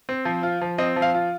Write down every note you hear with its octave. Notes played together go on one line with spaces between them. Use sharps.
C4
F3
F4
F3
C4 D#5
F3
F5
F4